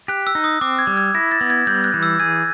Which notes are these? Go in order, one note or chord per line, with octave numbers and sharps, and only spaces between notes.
G4 F#6
E6
D#4
D#6
C4 D6
G#6
G3
G#6
E4 A#6
A6
B3
G#6
G3 G6
F#6
E3
E6
G#4 G#6